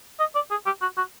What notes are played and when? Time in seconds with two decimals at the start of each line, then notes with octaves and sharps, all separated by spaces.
0.19 D#5
0.35 D5
0.51 G#4
0.66 G4
0.82 F#4
0.97 F#4